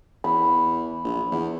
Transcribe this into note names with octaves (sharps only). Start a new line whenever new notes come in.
E2 B5
A#1
E2